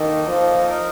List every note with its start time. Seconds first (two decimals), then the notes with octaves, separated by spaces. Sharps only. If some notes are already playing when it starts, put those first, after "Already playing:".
Already playing: D#3 A#3 D#4 A4 D#5
0.28 F3
0.67 D#4 A#4 D#5